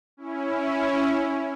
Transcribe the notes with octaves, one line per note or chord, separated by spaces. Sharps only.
C#4 E4